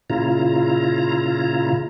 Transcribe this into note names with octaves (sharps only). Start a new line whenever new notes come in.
A#2 C#3 E4 F4 A#5